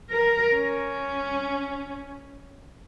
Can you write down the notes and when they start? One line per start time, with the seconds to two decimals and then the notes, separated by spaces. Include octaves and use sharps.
0.11 A#4
0.55 C#4